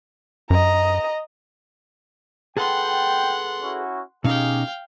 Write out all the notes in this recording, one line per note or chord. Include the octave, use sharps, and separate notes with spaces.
F#2 D#5 A#5
G#4 A4 B4 F#5 G5 C6
C#4 E4 F#4
B2 C#4 D#4 G4 G#4 F5 G5